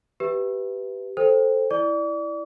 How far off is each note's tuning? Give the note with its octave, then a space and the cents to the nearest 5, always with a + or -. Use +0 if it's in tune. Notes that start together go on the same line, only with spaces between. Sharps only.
G4 -10 B4 +0 E5 +0
A4 +0 C5 +0 G5 +15
E4 +0 D5 +0 D6 -45